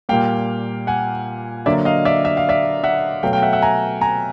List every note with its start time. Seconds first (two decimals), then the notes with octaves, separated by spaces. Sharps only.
0.09 A#2 G3 A#3 F5 G5
0.87 F#5 G#5
1.66 D3 F#3 A#3 D5 E5
1.85 D#5 F5
2.05 D5 E5
2.25 E5
2.37 F5
2.49 D5 E5
2.84 E5 F#5
3.23 B2 F#3 A3 F5 G5
3.33 F5 G5
3.43 E5 F#5
3.53 E5 F#5
3.62 G#5 A#5
4.01 G#5 A#5